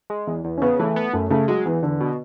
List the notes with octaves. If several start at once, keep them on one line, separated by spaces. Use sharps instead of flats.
G#3
E2
E2
C#4
C#3 B3
E3 A3
B3
F#2 A3
C#3 A3
F#3 G#3
E2 E3
E2 D3
B2